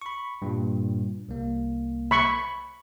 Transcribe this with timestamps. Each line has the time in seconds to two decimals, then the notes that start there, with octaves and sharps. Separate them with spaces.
0.02 B5 C#6
0.42 G2 A#2
1.29 C2 A#3
2.11 B5 C#6